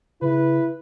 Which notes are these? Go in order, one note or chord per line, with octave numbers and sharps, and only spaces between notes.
C#3 E4 B4